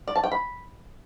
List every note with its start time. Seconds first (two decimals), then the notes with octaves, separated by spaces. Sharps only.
0.08 D5
0.16 A5
0.24 G5
0.32 B5